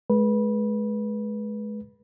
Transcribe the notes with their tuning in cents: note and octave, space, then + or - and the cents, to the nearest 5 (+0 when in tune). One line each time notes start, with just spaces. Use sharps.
G#3 +30 B4 -20